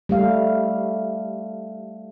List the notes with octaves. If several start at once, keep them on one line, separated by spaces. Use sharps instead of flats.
G3 A3 F5